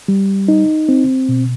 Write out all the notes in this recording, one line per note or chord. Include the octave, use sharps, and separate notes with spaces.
G3
D#4
C4
B2